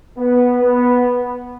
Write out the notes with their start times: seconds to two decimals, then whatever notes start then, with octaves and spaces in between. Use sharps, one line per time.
0.16 B3
0.61 B3